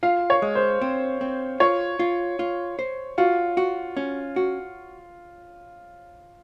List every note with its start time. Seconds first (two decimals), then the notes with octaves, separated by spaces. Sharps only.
0.03 F4 F5
0.30 C#5
0.42 G#3
0.55 C5
0.81 C4
1.21 C4
1.60 F4 C#5
1.99 F4
2.39 F4
2.79 C5
3.18 F4 F#4
3.57 F#4
3.97 C#4
4.36 F#4